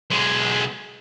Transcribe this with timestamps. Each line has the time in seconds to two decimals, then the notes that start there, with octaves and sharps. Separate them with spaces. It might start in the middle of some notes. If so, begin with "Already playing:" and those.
0.11 B1 G#3